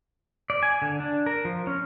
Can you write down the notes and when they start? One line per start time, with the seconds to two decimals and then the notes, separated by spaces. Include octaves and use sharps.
0.50 D5
0.63 G#5
0.82 D3
1.00 D4
1.26 A#4
1.45 F3
1.67 C#4